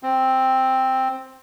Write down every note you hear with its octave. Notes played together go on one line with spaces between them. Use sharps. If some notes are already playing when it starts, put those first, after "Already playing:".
C4